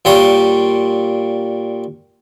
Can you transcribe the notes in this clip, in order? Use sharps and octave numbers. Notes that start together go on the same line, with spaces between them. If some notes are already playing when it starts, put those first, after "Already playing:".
A#2 G3 C#5